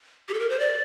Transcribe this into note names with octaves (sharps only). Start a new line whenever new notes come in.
G4
A4
A#4
C5
D5